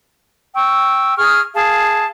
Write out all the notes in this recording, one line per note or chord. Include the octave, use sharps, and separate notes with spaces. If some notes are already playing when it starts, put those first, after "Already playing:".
G5 C#6 E6
G#4 C#6 D#6 F6
G#4 F5 A5